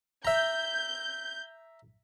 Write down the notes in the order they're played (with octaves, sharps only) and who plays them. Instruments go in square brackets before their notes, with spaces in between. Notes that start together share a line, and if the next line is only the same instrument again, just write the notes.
[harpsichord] E5 A#5 [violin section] G6